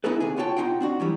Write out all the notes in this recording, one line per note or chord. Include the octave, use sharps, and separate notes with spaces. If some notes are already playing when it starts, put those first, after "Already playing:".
B3 D#4 E4 G#4 A4 B4
D#2 C3 G#4
B3 F4 F#4 C#5 G5 A5
B2 G#3 D#4 F4 F#5 G5
C4 D4 F#4
E3 F#3 G3